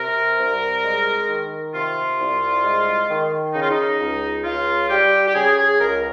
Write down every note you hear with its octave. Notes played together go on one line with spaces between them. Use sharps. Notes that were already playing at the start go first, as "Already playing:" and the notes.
Already playing: C3 A#4
C2
G#3
D#3
C3 F4
C2
G#3
D#3
C#3 D#4
F4
D#4
C#2
C#2 F4
G3 G4
G4
C#3 G#4
G#4
C#2 A#4